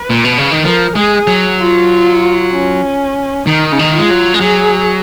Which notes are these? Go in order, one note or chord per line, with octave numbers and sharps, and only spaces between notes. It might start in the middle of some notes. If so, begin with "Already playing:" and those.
Already playing: B4
A#2
B2
C#3
D#3
F3 A#4
G#3 G#4
F#3
F4
C#4
D#3 D#4
C#3
D#3
G#3 F4
F#3
G#3
F#3 G#4